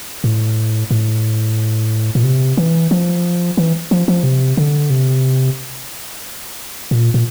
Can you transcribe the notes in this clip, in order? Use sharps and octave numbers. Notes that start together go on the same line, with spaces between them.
A2
A2
A#2
C3
E3
F3
E3
F3
F3
C3
D3
C3
A#2
A#2